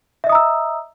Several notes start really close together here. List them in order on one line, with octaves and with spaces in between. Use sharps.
E5 D#5 D#6 A#5 E6